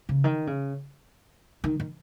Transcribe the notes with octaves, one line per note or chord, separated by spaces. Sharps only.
C#3
D#3
C#3
D#3
D#3